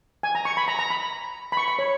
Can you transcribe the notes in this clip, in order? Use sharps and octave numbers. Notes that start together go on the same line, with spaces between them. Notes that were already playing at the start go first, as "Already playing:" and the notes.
G#5
A#5
C#6
B5
A#5
A#5
B5
B5
C#6
B5
C#5